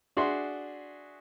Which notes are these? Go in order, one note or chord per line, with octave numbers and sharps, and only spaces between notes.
D4 F#4 G#4 E5 C6